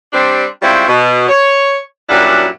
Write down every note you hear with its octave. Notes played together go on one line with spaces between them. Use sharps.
G3 C4 D4
G3 G#3 C4 C#4 E4 F4
B2
C#5
F#2 A#2 F#3 G3 D4 E4